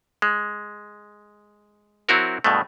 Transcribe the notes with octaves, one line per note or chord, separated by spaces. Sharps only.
G#3
F#3 C4 E4 F#4 A#4
G2 B2 G#3 A3